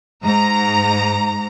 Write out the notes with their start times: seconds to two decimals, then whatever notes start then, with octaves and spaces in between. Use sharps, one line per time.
0.24 G#2 A#5